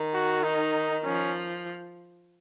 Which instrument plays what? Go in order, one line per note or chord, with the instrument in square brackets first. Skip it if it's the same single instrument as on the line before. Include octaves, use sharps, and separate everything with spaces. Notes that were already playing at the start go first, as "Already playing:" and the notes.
Already playing: [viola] D#3
[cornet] F#4
D#4
[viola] F3 [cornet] C#4